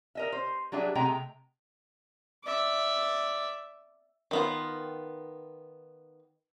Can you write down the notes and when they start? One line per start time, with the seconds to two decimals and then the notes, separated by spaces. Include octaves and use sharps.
0.15 A#4 D#5 E5
0.32 C5
0.72 F#3 G3 D4 G#4 E5 G5
0.95 C3 G#3 A3 D#5 G5 A#5
2.44 D5 E5
4.31 D#3 B3 F4